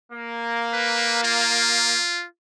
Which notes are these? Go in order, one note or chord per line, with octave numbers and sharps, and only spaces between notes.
A#3
B4
F4